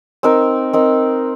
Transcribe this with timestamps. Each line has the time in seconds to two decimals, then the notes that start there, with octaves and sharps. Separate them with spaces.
0.23 C4 D#4 A#4
0.73 C4 D#4 A#4